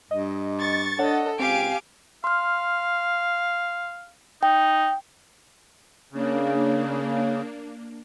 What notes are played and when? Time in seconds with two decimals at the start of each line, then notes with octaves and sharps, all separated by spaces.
0.11 G2 D#5
0.60 C#6 A6
0.99 D4 A4 C#5 D#5 F#5
1.40 C#2 C4 G4 F5 G#5 D7
2.24 F5 C6 F6
4.43 D#4 G5
6.13 C#3 A#3 D4